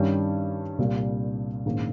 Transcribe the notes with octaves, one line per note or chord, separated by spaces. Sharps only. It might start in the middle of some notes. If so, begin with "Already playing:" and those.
Already playing: G2 D#3 G3 C#4
C2 A#2 G3
A#1 G#2 D#3 A#3 C#4